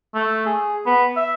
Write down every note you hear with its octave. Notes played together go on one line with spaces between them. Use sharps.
A3
G#4
B3
E5